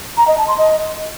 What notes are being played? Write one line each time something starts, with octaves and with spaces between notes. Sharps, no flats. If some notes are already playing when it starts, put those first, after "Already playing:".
A#5
D#5
A5
C6
D#5